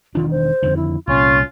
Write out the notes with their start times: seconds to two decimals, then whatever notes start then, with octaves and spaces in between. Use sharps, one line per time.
0.15 E1 D#3 D4 F4
0.31 C5
0.63 F2 D3 D#3
0.77 E4
1.08 C2 A#2 C#4 F4 C#6